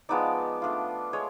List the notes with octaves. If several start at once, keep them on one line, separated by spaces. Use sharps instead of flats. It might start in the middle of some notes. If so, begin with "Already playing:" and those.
F3 G#3 B3 D#4 D5
A3 D4 F4
G#3 C#5